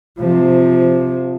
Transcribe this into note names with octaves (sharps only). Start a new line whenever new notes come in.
C3 F3